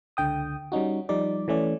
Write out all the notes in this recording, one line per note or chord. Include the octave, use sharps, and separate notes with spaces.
C#2 D3 G5 D#6
G3 C#4 D#4 F#4
F3 G3 D#4 D5
E3 A3 C#4 D5